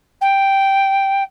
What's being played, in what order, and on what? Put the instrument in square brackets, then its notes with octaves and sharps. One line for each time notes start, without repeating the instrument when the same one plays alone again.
[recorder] G5